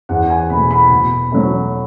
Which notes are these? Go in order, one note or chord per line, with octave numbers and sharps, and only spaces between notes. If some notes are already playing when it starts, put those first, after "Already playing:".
E2 F#5
G#5
B2 A3 B5
B5
B2
F#3 A3